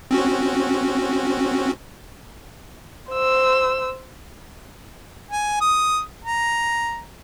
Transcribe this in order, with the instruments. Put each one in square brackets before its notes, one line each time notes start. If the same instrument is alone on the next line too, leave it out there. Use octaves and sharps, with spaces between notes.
[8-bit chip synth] C4 C#4 F#4
[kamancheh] C5 E6
[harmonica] G#5
D#6
A#5